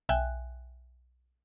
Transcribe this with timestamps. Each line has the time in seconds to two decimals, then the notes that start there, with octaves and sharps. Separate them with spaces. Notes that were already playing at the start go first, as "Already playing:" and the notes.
0.09 B1 E5 G5 G#5 F#6